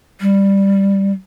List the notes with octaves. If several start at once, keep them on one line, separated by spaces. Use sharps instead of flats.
G3